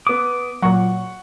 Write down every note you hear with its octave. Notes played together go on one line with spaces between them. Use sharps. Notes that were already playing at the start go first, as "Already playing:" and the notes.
B3 D6 D#6
A#2 F#3 F#5 C#6